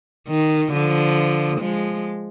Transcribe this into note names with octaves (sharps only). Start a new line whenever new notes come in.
D#3
D3 F3
F3 G#3